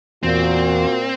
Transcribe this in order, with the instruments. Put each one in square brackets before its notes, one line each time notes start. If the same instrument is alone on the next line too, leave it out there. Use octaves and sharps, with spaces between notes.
[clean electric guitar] E2 [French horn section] A#2 [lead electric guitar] C4 [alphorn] F#4